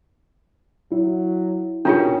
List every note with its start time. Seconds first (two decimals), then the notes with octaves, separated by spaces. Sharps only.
0.92 F#3 E4
1.85 B2 D#3 C#4 D4 F4 G#4